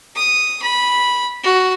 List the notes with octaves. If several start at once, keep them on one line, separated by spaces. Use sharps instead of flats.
D#6
B5
F#4